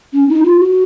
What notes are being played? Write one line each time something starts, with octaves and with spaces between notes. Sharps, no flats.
C#4
D#4
F4
F#4